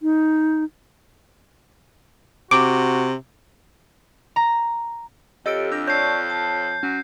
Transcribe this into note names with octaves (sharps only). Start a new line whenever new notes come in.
D#4
C3 F#4 D6 D7
A#5
F2 G4 A4 C#5 D#5 E6 D7
D4 E6 G6 A#6
C#5 D5 A5 C#6 G6 C7
A5
F#3 C#4